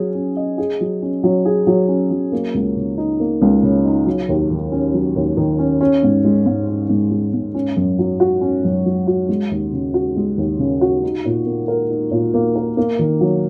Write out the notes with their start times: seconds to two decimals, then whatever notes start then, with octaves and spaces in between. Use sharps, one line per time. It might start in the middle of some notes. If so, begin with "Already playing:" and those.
Already playing: F#3 C#4 G#4
0.15 C#4
0.37 D#5
0.58 G#4
0.80 F#3
1.02 C#4
1.23 F#3
1.45 G#4
1.67 F#3
1.88 C#4
2.10 F#3
2.32 A#3
2.54 C#2
2.76 C#3
2.98 D#4
3.20 A#3
3.41 C#2
3.63 C#3
3.85 D#4
4.07 F#3
4.29 D#2
4.51 D#3
4.72 C#4
4.94 F#3
5.16 D#2
5.37 D#3
5.59 C#4
5.81 C#4
6.03 G#2
6.25 G#3
6.46 G#2
6.68 C#4
6.89 G#2
7.11 G#3
7.33 G#2
7.55 C#4
7.76 F#2
7.99 F#3
8.20 F#4
8.41 C#4
8.64 F#2
8.86 F#3
9.07 F#4
9.29 G#3
9.51 D#2
9.73 C#3
9.94 F#4
10.16 G#3
10.38 D#2
10.59 C#3
10.81 F#4
11.03 D#4
11.25 A#2
11.46 A#3
11.68 A#4
11.90 D#4
12.11 A#2
12.34 A#3
12.56 A#4
12.77 A#3
12.99 D#3
13.21 F#3